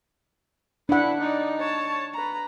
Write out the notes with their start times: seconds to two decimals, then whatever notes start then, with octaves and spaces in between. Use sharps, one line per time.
0.89 D4 E4 B4 F#5
1.21 D#4 D5
1.58 C#5 A5
2.13 B4 A#5